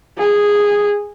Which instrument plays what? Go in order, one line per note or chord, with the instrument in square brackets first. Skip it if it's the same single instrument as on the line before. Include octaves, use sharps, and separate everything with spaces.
[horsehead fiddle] G#4